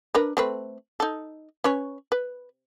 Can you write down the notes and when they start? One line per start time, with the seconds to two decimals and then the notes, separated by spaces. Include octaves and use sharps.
0.15 D4 A#4 B4
0.37 A3 C4 B4
1.00 D#4 A4
1.64 C#4 B4 C#5
2.12 B4